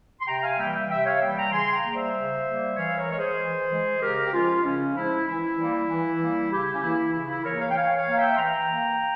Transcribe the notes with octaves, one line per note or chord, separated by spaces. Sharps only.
C6
C3 G5 A#5
F5 G#5
E3 G3 A#3 E5 G5
E5 G5
C3 E5 G5
C#5 F5
E3 G3 A#3 E5 G5
G5 A#5
C#3 G#5 C6
G5 A#5
G3 A#3
C5 E5
C#3
G3 A#3
E3 C#5 F5
E5
A#4 C#5
G#3 C#5
G#4 C5
E3
G#3
C#3 G4 A#4
G4
F3 G#3 C#4 F4
C#3 C#4
F3 G#3 E4
E3 E4
G3 A#3
E3
G3 A#3
C#3 E4 G4
C#4
E3 A#3 E4
C#3 E4
E4
E3 A#3 A#4 C#5
C#5 F5
G5
E3 C#5 F5
C#5 F5
A#3
E5 G5
C6
E3 G5 A#5
A#3